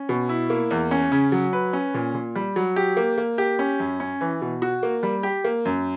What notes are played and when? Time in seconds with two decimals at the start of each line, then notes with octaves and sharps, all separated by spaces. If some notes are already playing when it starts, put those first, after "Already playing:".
Already playing: C#4
0.09 B2
0.29 E4
0.50 A#3
0.71 E2
0.91 C#4
1.12 C#3
1.32 F#3
1.53 B4
1.73 C#4
1.94 A#2
2.14 A#2
2.35 G3
2.56 F#3
2.76 G4
2.97 A#3
3.18 A#3
3.38 G4
3.59 C#4
3.79 F#2
4.00 C#4
4.21 E3
4.41 B2
4.62 F#4
4.83 A#3
5.03 G3
5.23 G4
5.44 A#3
5.65 F#2